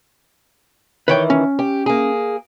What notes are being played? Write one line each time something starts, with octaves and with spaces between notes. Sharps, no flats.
D#3 E3 B4 C#5 G5
C#4
G4
A#3 G#4